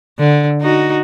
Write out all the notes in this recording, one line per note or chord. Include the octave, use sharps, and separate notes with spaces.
D3
D#4 F#4